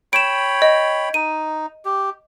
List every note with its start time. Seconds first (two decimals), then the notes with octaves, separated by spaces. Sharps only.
0.13 C#5 G5 B5 D7 E7
0.62 D#5
1.14 D#4 D#7
1.85 G4